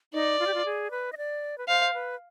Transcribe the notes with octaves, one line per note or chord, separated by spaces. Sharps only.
D#4 D5
F4
G4
F4
G#4
B4
D#5
D5
B4
C5 F5
B4